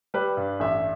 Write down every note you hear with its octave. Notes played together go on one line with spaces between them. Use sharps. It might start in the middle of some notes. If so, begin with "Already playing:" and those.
G3 B4
G2
A1 E5